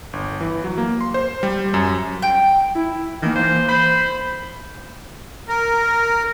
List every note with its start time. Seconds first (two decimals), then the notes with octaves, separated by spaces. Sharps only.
0.13 G1
0.41 E3
0.64 F#3
0.78 A#3
1.01 C6
1.14 C5
1.43 G3
1.74 F#2
2.22 G5
2.75 E4
3.22 D#3 E3 A#3
3.36 C5
3.68 C5 B5
5.48 A#4